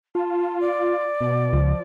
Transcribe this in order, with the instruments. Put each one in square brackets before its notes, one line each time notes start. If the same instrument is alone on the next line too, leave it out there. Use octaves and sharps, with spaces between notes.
[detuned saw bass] F4 [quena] A5
[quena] D5
[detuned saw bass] B2
[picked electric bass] C#2 [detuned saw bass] F3